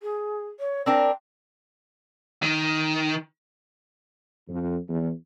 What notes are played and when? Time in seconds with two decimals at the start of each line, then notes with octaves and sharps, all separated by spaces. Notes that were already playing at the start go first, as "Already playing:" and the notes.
0.01 G#4
0.59 C#5
0.86 C4 D4 A#4 G5
2.43 D#3
4.49 F2
4.87 E2